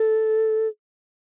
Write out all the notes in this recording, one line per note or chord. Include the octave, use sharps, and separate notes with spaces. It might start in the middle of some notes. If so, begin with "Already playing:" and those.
Already playing: A4